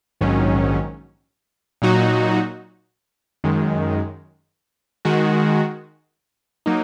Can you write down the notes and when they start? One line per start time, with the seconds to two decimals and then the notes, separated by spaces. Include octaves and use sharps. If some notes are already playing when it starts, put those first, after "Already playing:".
0.21 A#1 G#2 D#3 F#3 C#4
1.82 A#2 F#3 D#4 F#4
3.44 F#2 D#3 G#3
5.05 D#3 G#3 F#4
6.66 F#3 A#3 D#4